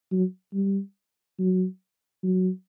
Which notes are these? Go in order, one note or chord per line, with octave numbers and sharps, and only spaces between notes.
F#3
G3
F#3
F#3